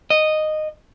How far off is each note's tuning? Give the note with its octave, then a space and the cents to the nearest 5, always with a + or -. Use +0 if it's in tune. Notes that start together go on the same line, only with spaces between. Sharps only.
D#5 -10